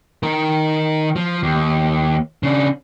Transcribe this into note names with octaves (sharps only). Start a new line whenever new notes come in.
D#3 A#4
F3
D#2
C#3 D4